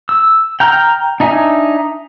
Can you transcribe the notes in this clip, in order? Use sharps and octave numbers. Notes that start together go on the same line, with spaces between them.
E6
G5 A#5 F6
D4 D#4 E5 G#5